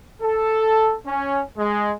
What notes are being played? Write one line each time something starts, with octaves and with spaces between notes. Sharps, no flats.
A4
C#4
G#3